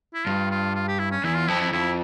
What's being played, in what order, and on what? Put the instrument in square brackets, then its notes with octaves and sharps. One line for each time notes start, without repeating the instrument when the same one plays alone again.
[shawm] E4
[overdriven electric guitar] G2 [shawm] F4
[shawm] F4
F4
G4
E4
C#4
[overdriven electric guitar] E2 [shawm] E4
[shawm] F4
[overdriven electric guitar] F2 [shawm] E4
[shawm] E4
[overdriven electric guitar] F2 [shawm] E4